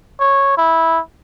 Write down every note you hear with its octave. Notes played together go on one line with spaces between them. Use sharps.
C#5
E4